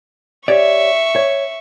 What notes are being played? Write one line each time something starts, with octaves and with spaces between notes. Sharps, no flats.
G4 C#5 D5 E5 C#6
C#5